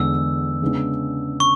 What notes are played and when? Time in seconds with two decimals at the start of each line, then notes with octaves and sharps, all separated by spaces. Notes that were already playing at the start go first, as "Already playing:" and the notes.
Already playing: E2 D3 G#3 B3 E6
0.62 C#3 G#3 B3 D4
1.40 C#6